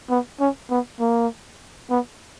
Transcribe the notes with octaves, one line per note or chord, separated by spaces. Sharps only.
B3
C#4
B3
A#3
B3